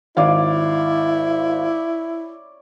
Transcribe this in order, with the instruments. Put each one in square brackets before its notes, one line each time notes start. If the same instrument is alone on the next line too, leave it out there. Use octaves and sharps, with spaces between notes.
[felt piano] G#1 F5 [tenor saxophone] E4 [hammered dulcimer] C#5 D5